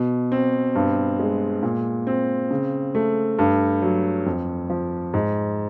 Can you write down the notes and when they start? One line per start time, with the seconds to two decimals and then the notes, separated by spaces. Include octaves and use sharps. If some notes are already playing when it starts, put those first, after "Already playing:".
Already playing: B2
0.32 C4
0.75 G2
1.19 G#3
1.63 A#2
2.07 C4
2.51 C#3
2.95 A3
3.39 G2
3.82 F#3
4.26 F2
4.70 F3
5.14 G#2